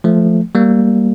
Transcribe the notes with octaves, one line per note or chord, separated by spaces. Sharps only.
F3 A3
G3 A#3